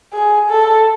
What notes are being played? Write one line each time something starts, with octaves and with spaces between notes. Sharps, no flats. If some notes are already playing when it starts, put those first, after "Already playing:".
G#4
A4